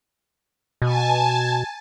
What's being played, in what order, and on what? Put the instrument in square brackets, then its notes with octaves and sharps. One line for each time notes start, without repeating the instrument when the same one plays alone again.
[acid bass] B2 [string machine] G#5 A5